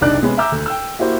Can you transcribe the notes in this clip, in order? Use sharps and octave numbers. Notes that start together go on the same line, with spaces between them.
F#1 C2 D4 D#4 D5 F#6
C3 G#3 B3 C#4
E5 G#5 A#5 D6 E6 G6
D2
G5 E6
A#3 E4 F#4 G4 C5